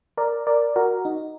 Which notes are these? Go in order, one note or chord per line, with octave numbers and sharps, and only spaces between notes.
A#4 D5
A#4 D5
F#4 A#4
D#4